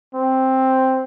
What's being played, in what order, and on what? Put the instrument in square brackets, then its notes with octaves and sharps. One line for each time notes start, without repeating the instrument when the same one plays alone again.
[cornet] C4